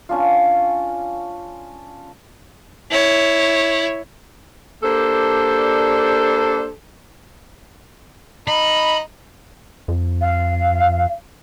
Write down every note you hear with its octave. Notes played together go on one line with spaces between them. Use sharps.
C#4 D4 F4
E4 C#5
A#3 D4 G4 A4 C5 D5
D#4 B5
F2
F5